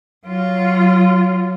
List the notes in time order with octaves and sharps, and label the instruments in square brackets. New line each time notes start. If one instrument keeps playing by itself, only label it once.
[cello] F#3 F4